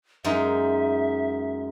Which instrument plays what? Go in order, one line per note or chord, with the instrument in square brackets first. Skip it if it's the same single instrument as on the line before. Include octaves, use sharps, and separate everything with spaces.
[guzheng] F#2 G#3 D#4 [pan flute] E5